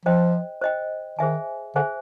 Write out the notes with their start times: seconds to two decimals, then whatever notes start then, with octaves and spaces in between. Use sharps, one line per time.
0.06 F3 C5 D#5 G5
0.62 C5 D#5 G5
1.19 D#3 G#4 C5 E5 G#5
1.75 D3 G#4 C5 E5 G#5